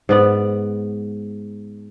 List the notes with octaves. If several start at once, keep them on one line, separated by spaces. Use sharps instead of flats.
G#2 B3 D5